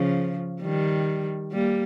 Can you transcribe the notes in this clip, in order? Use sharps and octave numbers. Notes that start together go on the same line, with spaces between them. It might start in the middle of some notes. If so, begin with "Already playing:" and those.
Already playing: C#3 F3
D#3 G3
G3 A#3